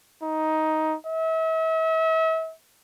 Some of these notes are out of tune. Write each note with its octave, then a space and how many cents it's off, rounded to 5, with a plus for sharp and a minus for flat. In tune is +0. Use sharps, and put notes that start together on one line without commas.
D#4 +10
E5 -40